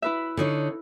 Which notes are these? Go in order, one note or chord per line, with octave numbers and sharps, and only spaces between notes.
E4 B4 E5
D3 D#4 C#5